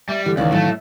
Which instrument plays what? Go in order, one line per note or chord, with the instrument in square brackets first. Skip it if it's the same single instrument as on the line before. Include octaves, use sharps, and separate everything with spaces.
[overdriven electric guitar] G3 [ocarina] E5
[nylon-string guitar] D3 [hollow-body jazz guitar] E3 [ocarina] G4
[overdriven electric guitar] C#2 [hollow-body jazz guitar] D#3 E3 C#4 [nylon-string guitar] D5 [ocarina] F5
[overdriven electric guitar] A2 A3 [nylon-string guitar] F#3